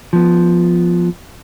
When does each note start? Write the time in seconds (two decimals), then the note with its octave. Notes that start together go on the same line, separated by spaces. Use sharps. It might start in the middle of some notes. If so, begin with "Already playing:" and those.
0.13 F3 B3